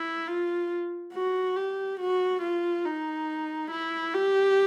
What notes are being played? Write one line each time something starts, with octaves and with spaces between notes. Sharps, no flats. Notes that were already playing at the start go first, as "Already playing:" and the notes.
Already playing: E4
F4
F#4
G4
F#4
F4
D#4
E4
G4